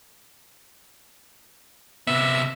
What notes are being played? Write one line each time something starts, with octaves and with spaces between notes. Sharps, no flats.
C3 B3 E5